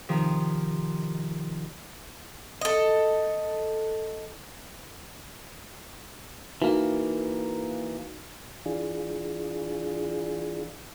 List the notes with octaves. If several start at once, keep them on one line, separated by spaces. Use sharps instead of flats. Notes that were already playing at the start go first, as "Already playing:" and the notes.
C3 D#3 F3
A4 D#5
E3 A#3 D#4 F#4
E3 D4 F4 G#4